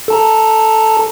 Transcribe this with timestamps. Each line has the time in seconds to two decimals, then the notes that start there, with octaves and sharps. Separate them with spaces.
0.08 A4 A5 A#5